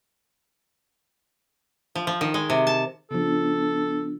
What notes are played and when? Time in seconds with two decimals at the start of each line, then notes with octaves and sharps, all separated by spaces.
1.95 F3
2.07 F3
2.21 D#3
2.34 G#3
2.50 C3
2.67 A5
3.11 C#3 F3 B3 D4 A4